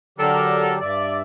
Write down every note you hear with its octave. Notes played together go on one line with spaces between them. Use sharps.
D3 F#3 D4 G4 A4 A#4
G2 D5 E5